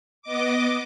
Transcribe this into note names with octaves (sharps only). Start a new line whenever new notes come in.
B3 D#5 D6